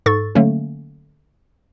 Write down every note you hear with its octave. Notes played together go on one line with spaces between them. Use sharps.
G#2 A4 C#6 A6
D3 F#3 A3 A#3 C#4